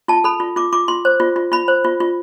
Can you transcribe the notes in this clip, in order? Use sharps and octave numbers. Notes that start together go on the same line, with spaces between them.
F4 A5
A4 B5
F4
F4 D6
F4 D6
F4 C6
C5
F4
F4
F4 B5
C5
F4
F4